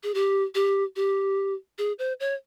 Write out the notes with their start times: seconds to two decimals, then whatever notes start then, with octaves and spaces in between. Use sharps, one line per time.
0.03 G#4
0.14 G4
0.55 G4
0.96 G4
1.78 G#4
1.99 C5
2.20 C#5